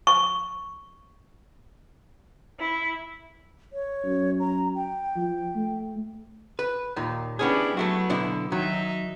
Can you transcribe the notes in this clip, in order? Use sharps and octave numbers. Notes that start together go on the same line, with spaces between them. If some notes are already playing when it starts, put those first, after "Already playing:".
C#6
E4
C#5
F#2
A#5
G5
F3
A3
B4
D#2 A#2 D#3
B3 C#4 D4 E4 G4 G#4
F#3 A3 B3 E4 F#4
B2 D3 E4
D#3 F#3 D#4 E5